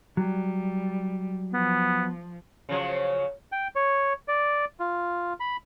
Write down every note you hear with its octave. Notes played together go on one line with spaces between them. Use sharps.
F#3 G3
F3 B3
C#3 F3 F#3
G5
C#5
D5
F4
B5